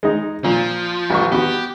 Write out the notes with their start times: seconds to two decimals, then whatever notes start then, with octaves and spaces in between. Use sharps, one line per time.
0.03 G#3 D#4
0.44 A#2 F3
1.10 A1 C#6
1.32 B3 F#4 G4